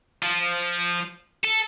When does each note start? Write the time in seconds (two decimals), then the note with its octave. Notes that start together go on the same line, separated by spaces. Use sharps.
0.23 F3
1.44 A4